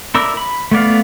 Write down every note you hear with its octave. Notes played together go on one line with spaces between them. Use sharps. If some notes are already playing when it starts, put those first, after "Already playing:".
E4 A#4 D5 E6
B5
A3 B3 D5 F5